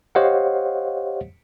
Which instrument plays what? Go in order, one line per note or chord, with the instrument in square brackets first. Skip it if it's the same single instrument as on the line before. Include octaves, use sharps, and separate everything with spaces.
[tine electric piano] G4 C5 C#5 D#5 F5 F#5